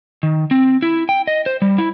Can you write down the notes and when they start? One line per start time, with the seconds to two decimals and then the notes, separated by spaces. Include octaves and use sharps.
0.23 D#3
0.51 C4
0.82 E4
1.09 G5
1.27 D#5
1.46 C5
1.62 G3
1.78 E4